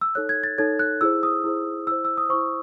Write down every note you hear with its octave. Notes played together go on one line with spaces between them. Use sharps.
E6
D#4 A4 C#5 F#6
G#6
A6
D#4 A4 C#5 G#6
F#6
E4 G#4 C5 E6
D#6
E4 G#4 C5
E4 C5 E6
E6
D#6
E4 C5 C#6